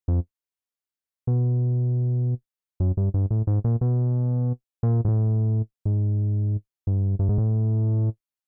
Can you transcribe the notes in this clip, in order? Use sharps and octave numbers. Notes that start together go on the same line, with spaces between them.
F2
B2
F#2
G2
G2
A2
G#2
A#2
B2
A#2
G#2
A2
G#2
G2
G2
G#2
A2